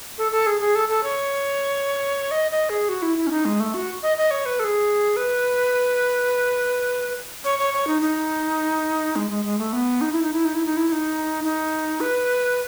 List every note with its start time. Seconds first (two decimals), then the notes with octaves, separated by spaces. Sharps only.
0.18 A4
0.32 A4
0.46 G#4
0.60 G#4
0.75 A4
0.89 A4
1.03 C#5
2.31 D#5
2.51 D#5
2.69 G#4
2.89 F#4
3.02 E4
3.17 E4
3.27 C#4
3.31 D#4
3.45 G#3
3.60 A3
3.74 F#4
4.03 D#5
4.17 D#5
4.31 C#5
4.46 B4
4.59 A4
4.64 G#4
5.16 B4
7.44 C#5
7.58 C#5
7.73 C#5
7.87 D#4
8.02 D#4
9.16 G#3
9.30 G#3
9.44 G#3
9.58 A3
9.73 B3
10.01 D#4
10.12 E4
10.22 D#4
10.33 E4
10.45 D#4
10.55 E4
10.65 D#4
10.77 E4
10.87 E4
10.92 D#4
11.44 D#4
12.00 B4